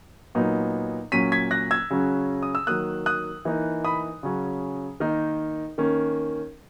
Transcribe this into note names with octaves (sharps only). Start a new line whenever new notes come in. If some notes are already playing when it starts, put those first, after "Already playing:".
A#2 F#3 B3 D#4
A#2 F#3 C#4 B6 D#7
G#6 B6
F#6 A#6
E6 G#6
C#3 F#3 C#4
D#6
E6
D#3 F#3 A#3 D#6 F#6
D#6 F#6
E3 A#3 D#4
B5 D#6
C#3 F#3 C#4
D#3 A#3 D#4
D#3 A#3 C#4